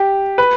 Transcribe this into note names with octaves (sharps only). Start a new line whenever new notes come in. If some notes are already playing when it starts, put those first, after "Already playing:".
Already playing: G4
B4